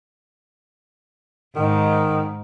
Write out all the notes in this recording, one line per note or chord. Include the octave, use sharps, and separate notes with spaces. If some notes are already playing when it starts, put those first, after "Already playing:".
G#2 D#3